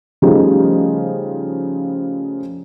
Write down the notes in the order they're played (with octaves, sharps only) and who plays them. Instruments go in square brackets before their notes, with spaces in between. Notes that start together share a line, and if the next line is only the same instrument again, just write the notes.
[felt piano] C#3 F3 G3 A3 D#4 G4